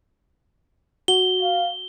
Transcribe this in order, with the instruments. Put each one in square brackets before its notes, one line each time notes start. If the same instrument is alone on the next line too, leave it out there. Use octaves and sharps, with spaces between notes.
[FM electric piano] F#4 [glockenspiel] G7
[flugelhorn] F5